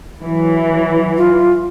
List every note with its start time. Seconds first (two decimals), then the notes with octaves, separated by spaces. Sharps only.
0.22 E3 F#3
1.17 F4